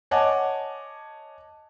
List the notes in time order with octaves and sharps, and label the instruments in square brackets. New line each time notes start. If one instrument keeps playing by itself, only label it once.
[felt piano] C#5 D#5 F#5 G#5 A5 D6